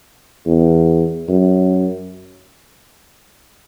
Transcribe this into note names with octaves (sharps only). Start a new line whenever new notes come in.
E2
F#2